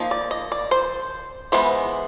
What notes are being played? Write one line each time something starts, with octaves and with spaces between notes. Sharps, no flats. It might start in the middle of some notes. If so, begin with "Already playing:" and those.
Already playing: F3 A#3 D#4
D5
D#5
D5
C5
E3 G#3 B3 C5